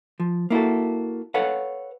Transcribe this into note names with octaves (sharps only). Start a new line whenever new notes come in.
F3
A#3 E4 F#4 A4
A4 B4 C#5 F5 F#5